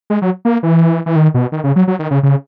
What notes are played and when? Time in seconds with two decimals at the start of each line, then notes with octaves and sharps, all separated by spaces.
0.10 G#3
0.22 F#3
0.45 A#3
0.63 E3
1.06 E3
1.16 D#3
1.34 B2
1.52 D#3
1.64 C#3
1.76 F#3
1.88 F#3
1.99 D#3
2.11 C#3
2.23 C#3